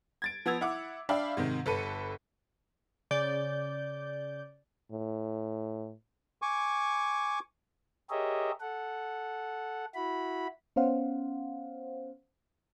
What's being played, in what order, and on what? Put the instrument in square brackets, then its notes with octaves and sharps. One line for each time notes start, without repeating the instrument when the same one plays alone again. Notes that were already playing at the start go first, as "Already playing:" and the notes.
[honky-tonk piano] G#6 A6 D7
F3 B3 E6 G#6 F7
E4 F#5 D6
D4 D5 E5 F5 G5 B5
G#2 C3 D#3
G1 A4 B4 C#7 D#7
[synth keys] C#3 D5 G6
[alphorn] A2
[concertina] G#5 C#6 D6
[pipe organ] G4 G#4 A#4 C#5 D#5 E5
A4 F#5
E4 F#4 B5
[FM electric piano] B3 C#4 C5 F5 F#5